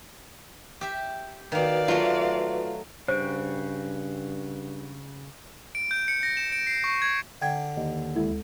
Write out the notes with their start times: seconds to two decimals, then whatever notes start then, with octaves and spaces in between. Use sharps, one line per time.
0.81 G4 E5
1.52 D#3 A#3 F#4 B4 D5 F5
1.88 F#3 A3 F4
3.08 G2 C#3 F#4 C5 G5
5.75 D7
5.91 G6
6.08 C#7
6.23 A#6
6.37 E7
6.52 D7
6.67 C7
6.84 C#6
7.02 G#6
7.42 D3 G5 G#6
7.77 D#2 D#5
8.15 D2 G#3 E4 A4